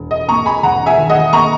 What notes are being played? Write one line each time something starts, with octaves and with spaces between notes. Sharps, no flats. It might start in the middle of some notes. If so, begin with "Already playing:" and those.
Already playing: E1
D#5
A#3 A#5 C#6
G#5 B5
E1 F#5 A#5
E5 G#5
D#3
D#5 F#5
A#3 A#5 C#6